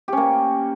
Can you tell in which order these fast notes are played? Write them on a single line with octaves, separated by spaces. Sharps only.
G4 C#4 A#3